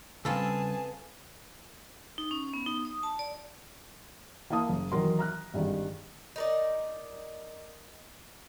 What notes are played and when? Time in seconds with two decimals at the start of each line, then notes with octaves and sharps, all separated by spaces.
0.25 C#3 G3 C4 F4 G#4 A4 B4 A5
2.18 D#4
2.31 C#4
2.54 B3
2.66 D#4
2.85 D#6
3.03 A5
3.19 D5
4.50 A#3 E4 F5 A5 D#6
4.69 F#1
4.92 D#3 E3 F#3 A#4 C6
5.19 A#5 F6 F#6
5.54 G#1 G2 D#3 G#3
6.36 D#4 A#4 D5